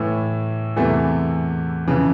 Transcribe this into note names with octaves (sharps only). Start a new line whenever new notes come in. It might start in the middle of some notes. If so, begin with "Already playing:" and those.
Already playing: A2 E3 A3
E2 C3 E3 A3
F2 C#3 E3